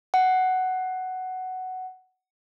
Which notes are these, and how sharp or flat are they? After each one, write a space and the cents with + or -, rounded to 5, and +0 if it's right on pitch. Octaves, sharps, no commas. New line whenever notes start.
F#5 +10